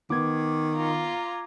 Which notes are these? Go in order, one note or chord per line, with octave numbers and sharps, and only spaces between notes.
D#3 B3 D6 G#6
F4 A#5